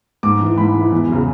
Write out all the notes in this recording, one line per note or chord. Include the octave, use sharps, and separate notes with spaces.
G#2 D6
E3
G#2 B5
E3
E2
C#3 F#3